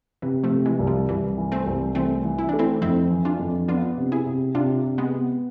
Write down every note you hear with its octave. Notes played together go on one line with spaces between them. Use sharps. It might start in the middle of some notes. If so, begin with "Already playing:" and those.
C3 E3
F3 A3
C3
E3 G#3
C2
F3
C2 E3
E3
A3 C4
C2
E3 A3 C4
E3
E4
A3 D4
C4 E4
F2 C4 E4
E3
D4 F4
F2
B3 D4 F4
C3
E4 G#4
C3
C3 D4 F4
C3
G#3 B3
B3